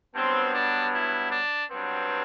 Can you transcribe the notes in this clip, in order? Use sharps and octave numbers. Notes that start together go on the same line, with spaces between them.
G2 F#3 B3 C4
D4
E4
D4
G2 F#3 B3 C4